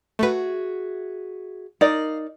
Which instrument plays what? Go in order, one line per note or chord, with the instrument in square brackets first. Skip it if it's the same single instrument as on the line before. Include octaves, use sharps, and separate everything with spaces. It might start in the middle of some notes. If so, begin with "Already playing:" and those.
[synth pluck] A3 B4 [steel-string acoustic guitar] F#4 G#4 E5
[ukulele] D#4 [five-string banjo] A#4 D5 [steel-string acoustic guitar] F5